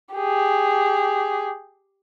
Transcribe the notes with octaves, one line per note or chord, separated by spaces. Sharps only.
G4 G#4